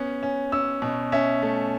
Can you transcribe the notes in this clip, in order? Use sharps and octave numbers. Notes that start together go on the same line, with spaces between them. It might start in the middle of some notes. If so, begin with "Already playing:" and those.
Already playing: B3 C#4
C#4
C#4 E6
B2
C#4 E5
A3